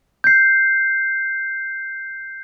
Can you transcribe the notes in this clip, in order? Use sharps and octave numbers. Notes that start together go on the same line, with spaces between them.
G6 C7